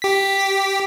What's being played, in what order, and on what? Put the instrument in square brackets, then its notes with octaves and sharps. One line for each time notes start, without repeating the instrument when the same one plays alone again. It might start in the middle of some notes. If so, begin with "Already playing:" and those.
[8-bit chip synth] G4 B6